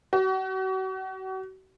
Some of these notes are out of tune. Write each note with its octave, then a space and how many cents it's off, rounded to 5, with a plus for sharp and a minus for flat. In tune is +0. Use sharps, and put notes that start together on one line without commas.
F#4 +40